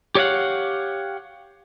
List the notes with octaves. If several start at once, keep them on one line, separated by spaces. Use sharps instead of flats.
G4 C#5 D5 F5 F#5